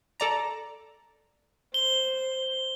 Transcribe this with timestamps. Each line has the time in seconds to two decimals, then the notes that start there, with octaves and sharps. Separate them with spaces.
0.20 A4 D5 A#5
1.74 C5 G7